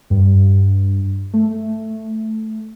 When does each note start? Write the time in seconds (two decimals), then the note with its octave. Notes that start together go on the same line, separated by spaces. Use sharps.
0.10 G2
1.33 A3